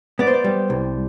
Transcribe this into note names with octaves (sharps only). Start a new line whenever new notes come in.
B3 D5
C5
D5
G3
C2